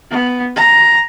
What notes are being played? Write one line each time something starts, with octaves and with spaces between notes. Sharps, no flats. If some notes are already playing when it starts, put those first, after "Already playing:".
B3
A#5